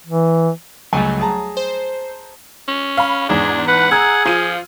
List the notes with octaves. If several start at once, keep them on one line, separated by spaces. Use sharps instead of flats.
E3
C#2 F#3 G3 A3 G#5
G#4 A5 A#5
C5
C#4
F5 B5
E2 G#2 D4 G#4
B4 F#5
G#4 A#5 E6 G#6
F3 F4 D#7